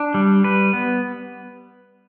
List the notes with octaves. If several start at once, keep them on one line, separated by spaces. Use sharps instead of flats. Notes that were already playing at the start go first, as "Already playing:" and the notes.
Already playing: D4
G3
B4
B3